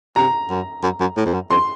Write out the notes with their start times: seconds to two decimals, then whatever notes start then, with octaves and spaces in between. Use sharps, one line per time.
0.16 C3 A#5
0.50 F#2
0.83 F#2
1.00 F#2
1.17 A2
1.26 F2
1.33 F#2
1.51 F2 C6